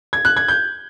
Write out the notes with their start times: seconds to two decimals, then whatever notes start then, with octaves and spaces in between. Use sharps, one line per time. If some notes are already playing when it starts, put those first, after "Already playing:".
0.13 G#6
0.25 F#6
0.37 G#6
0.48 G6